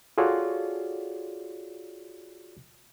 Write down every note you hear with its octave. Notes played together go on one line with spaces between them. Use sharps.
F4 F#4 G#4 A4 C#5 D5